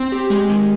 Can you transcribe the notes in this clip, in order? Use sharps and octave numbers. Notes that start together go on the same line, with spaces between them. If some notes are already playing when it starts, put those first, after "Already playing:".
Already playing: C4
G4
G#3
D#3